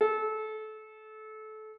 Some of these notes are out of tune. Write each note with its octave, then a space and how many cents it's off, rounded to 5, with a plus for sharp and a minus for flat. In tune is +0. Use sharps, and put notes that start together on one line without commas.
A4 -25